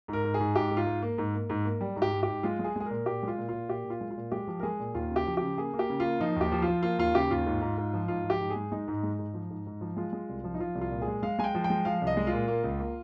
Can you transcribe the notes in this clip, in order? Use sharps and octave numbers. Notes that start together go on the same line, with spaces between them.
G#2 A#4
G#2
G#4
G#2
G#2 G4
G#2
F4
G#2
A#3
G#2
A#3
G#2
A#3
G3
G#2
G4
G#2
G#2 G4
G#3 F4
G#3
G#4
G#3 G#4
A#2 A#4
A#2 G4
G#3 F4
A#2
A#2 F4
A#2 G4
A#2
F4
G#3
F4
A#2
G#3 G4
F3
A#4
G#3 G#4
A#2
D#2 F4
C#3
G4
F3
C#3 G4
A#3 G#4
A#3
G4
C#3
A#3 F4
F3 D#4
D#2 G4
F3
F4
F3
A#3 F4
D#2 F4
C#3 G4
D#2 F4
G#2
G#2
G#2
F3
G#2 F4
F3
G4
G#2
G#4
G#3
G#3 D#4
G#2
G#3
G#2
F3
G#2
G#2
F3
G#3 F4
G#3
C2
F3
D#4
F3 F4
C2
F4
A#2
G#4
G#3
G#3 F5
G#3 G#5
G5
F3
G5
G#3
F3 F5
C2
D#5
G#3
F4
A#2
A#3
C#2
A#3